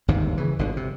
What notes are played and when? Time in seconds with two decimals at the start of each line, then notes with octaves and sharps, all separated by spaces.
0.08 G1 D#2 G#2 C3
0.37 C#3 E3
0.59 G1 B2 D3
0.77 C3